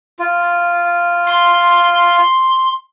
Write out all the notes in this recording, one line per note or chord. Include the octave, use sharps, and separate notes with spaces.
F4
C6